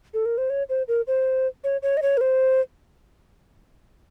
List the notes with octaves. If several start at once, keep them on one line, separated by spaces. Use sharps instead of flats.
A4
A#4
C5
C#5
C5
A#4
C5
C#5
C#5
D#5
C#5
A#4
C5